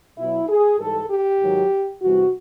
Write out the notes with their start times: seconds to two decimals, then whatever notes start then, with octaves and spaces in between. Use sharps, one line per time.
0.18 B2 F#3 E4
0.49 G#4
0.80 G#2 E3 G3 A4
1.10 G4
1.41 G#2 D#3 F#3
2.02 E2 C3 E3 G3 F#4